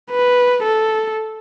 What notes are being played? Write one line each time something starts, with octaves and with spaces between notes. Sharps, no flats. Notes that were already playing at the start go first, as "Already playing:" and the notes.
B4
A4